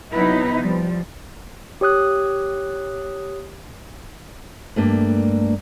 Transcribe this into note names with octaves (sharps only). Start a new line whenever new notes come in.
C3 F#3 B3 D#4 E4 B4
F3 G3
G4 C#5 D#6 F#6
G2 A3 A#3 D4